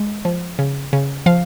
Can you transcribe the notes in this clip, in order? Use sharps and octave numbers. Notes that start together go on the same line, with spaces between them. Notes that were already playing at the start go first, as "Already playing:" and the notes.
Already playing: G#3
F3
C#3
C#3
F3 F5